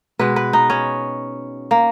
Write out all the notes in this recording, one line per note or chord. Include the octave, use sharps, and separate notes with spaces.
B2 G#3 B4
B4
D#4
C#4
A#3